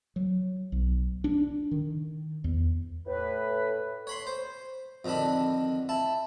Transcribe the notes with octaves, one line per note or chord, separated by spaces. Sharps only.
F#3
B1
D4
D#3
E2
A2 B4
C#5 B5 C6
C5
F2 D3 D#3 D4 B5
E4 A5